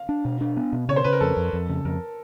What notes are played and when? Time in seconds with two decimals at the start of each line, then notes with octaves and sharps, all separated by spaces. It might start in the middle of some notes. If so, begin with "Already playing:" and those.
Already playing: F5
0.09 D4
0.25 B2
0.41 D4
0.57 B3
0.73 B2
0.89 C#3 C#5
0.96 C5
1.04 C#3 B4
1.13 A#4
1.21 F2 A4
1.37 F2
1.53 F2
1.69 C#3
1.85 F2 A#4